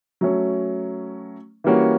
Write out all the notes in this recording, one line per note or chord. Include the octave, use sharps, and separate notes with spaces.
F#3 A3 C#4
E3 G3 A#3 C#4 F#4